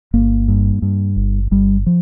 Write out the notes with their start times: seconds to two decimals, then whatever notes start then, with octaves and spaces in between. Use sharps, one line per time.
0.14 G1 A#3
0.48 G2
0.82 G2
1.16 G1
1.51 G1 G3
1.86 F3